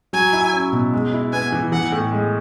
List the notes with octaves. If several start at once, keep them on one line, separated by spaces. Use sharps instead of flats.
F#3 G#5
E4
C#4
B2
G#3
E4
B3 G#5
E3
E3 F#5
A2
G#3